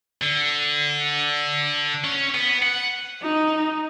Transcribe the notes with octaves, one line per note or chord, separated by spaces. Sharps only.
D3
C#4
B3
F#5
D#4